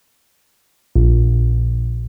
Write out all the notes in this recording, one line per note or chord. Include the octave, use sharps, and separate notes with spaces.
A#1